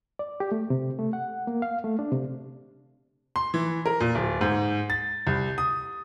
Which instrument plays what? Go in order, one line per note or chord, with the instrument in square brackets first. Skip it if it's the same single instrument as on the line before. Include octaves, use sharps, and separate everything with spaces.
[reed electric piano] D5
G4
A3
C3
A3
F#5
A#3
F5
A3
D4
C3
[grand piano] C6
E3
A#4
A#2
D1
G#2
A6
C2
D#6